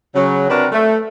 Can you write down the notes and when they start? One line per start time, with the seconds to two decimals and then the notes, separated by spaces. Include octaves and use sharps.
0.15 C#3 F#3
0.49 C3 C4 D4 F#4 A#4 B4
0.72 A3